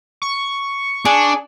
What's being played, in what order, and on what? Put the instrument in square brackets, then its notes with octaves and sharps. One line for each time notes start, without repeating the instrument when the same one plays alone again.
[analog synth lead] C#6
[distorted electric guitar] D4 [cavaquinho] G#4